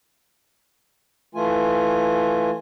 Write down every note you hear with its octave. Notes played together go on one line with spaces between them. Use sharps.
E3 A3 F4 G#5